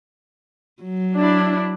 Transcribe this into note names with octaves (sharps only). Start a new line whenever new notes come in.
F#3
D4 E4